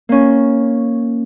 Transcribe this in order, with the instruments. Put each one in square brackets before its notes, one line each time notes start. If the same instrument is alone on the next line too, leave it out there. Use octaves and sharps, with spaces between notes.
[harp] A#3 C#4